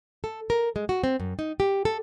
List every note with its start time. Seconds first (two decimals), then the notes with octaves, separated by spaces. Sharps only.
0.24 A4
0.50 A#4
0.76 G#3
0.89 F#4
1.04 C4
1.20 F#2
1.39 D#4
1.60 G4
1.85 A4